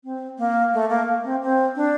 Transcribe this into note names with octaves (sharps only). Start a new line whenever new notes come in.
C4
A#3
A3
A#3
C4
C4
D4